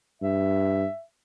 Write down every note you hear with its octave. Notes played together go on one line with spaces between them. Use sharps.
G2 E5